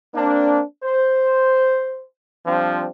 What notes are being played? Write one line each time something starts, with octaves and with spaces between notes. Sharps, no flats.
A#3 C4 D4
C5
F3 G3 C4 D4 F4